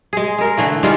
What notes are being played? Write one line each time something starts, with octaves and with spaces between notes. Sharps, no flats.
G#3 G#4
G#3 A#4
D3 E3 A3
D#3 G3 G#3 F4